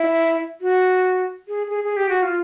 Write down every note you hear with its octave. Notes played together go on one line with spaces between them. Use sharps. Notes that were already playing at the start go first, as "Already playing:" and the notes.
Already playing: E4
F#4
G#4
G#4
G#4
G4
F#4
F4